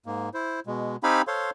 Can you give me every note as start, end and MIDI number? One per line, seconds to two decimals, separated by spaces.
0.06 0.29 44
0.06 0.29 58
0.34 0.60 64
0.34 0.60 72
0.67 0.96 47
0.67 0.96 56
1.03 1.22 60
1.03 1.22 63
1.03 1.22 67
1.03 1.22 77
1.03 1.22 80
1.03 1.22 83
1.27 1.50 69
1.27 1.50 72
1.27 1.50 73
1.27 1.50 77
1.27 1.50 84